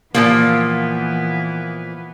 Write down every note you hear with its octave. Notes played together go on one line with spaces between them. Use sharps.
A#2 E3 F3 A#3 B3